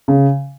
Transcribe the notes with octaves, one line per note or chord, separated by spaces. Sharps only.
C#3